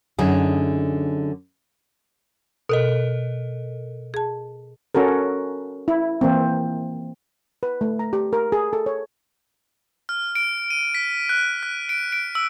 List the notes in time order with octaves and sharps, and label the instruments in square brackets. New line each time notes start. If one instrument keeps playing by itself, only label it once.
[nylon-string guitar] F#2 D3 D#4 G#4
[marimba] B2 [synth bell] A4 A#4 D#5
[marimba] G#4 A5
[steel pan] C#4 F#4 A4 A#4
E4
E3 A#3 C4
B4
A3
A#5
G4
A#4
G#4
A4
C#5
[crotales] F6
D7
D#7
B6
F#6
F#6
D7
D7
E6